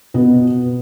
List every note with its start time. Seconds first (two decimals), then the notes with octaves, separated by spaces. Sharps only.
0.14 B2 B3